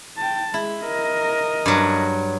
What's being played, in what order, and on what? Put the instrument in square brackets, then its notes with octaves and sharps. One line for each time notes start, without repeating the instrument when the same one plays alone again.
[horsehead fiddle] G5 A5
[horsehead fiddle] G#3 [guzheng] E4
[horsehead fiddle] A#4 D#5
[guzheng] G2 F#3